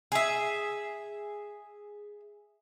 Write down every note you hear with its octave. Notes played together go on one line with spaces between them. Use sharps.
G#4 E5